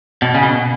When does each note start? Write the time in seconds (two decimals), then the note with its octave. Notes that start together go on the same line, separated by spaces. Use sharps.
0.22 B2
0.35 C#3
0.43 B2